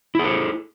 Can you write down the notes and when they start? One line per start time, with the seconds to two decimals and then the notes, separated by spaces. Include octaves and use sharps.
0.15 E4
0.19 G#4
0.24 A4